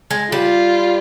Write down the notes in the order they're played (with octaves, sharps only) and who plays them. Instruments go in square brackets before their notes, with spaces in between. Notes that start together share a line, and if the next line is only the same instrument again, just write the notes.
[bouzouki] G#3
[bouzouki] G3 [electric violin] F4